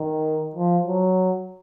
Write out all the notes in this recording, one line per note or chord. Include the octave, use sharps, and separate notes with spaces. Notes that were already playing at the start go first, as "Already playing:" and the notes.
Already playing: D#3
F3
F#3